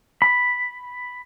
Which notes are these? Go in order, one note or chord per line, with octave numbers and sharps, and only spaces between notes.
B5